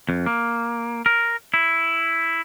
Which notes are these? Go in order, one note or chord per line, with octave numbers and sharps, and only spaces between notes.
F2
A#3
A#4
E4